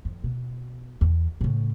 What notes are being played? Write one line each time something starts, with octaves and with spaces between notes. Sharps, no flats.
F2
B2
E2
A2 C#3